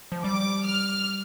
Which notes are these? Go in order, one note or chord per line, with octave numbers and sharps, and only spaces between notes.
F3
G3 D6
F6